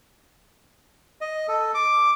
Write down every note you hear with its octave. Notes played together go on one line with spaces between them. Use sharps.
D#5
A4
D6